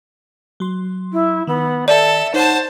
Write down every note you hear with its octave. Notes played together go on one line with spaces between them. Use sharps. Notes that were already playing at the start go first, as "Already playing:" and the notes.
F#3 C6
E4
D#3 B3
A4 D5 E5
D#4 C5 C#5 F#5 A5